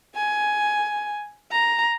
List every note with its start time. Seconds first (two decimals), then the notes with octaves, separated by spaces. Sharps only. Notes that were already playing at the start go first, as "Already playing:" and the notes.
0.15 G#5
1.51 A#5